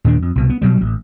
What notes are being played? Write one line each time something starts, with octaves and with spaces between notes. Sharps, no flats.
D#2 A#2 D#3 D4
F2
C2 B2
B3
B2 F#3 G3
A1